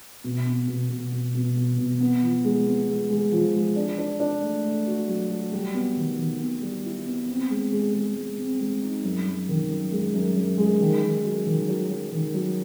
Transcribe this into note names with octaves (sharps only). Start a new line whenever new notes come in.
B2
B3
B2
B2
B2
B2
B2
B2
B3
F3
G#3
B3
G#3
G#3
F3
G#3
D4
D4
D4
A3
A3
F#4
F#3
F#4
G3
B3
D#3
D#3
B3
G3
E4
B3
C4
G#3
G#3
G#3
G#3
C4
G#3
D#4
F#2
F#2
D#3
F#2
G#3
F#2
F#2
G#3
D#3
D#3
F#3
D#3
F#3
F#3
D#3
F#3